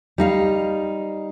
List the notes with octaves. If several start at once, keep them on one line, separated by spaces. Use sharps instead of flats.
G3 D#4 F5